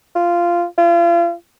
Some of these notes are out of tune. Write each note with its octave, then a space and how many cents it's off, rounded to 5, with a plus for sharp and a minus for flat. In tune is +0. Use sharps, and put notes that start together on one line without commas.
F4 -10
F4 -35